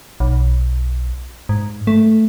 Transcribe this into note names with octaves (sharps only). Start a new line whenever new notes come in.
B1
G#2
A3